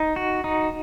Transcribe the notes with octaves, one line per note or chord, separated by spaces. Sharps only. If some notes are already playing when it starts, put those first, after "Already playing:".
Already playing: D#4
F#4
D#4